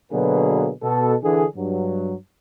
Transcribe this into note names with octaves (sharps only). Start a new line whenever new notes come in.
B2 D3 F#3 A#3 G#4 B4
B2 A4
D3 E3 G#4
G2 F#3